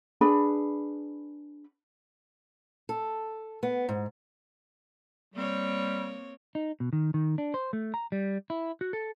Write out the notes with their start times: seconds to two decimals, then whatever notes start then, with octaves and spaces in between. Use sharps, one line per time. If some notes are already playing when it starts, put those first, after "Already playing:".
0.21 D4 G#4 B4 B5
2.89 A4
3.63 B3
3.89 G#2
5.34 G3 A#3 C4 C#5
6.55 D#4
6.80 B2
6.93 D#3
7.14 D#3
7.38 D4
7.54 C5
7.73 A3
7.94 A#5
8.12 G3
8.50 E4
8.81 F#4
8.93 A4